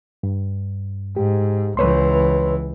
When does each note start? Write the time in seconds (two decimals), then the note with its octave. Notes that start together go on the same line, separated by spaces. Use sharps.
0.23 G2
1.16 G#2 G4
1.77 C#2 E3 B4 C#5 C6